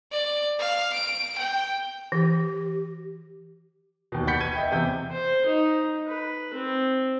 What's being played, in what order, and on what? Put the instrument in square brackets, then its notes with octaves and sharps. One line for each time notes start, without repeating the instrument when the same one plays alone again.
[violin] D5
F5
D7
G5
[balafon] E3 [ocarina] G4
[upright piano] D#2 B2
F#5 B5 G6 A6 B6 C#7
B4 G#6 D#7
D#5 E5 G5
E2 C3 G5 G6
[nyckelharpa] C5
D#4
B4
C4